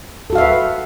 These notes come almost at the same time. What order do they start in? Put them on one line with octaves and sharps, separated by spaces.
A4 F#4 F5 E5 B4